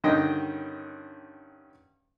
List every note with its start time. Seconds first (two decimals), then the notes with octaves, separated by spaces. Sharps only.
0.04 G2 D3 D#3 C#4 D#5 G5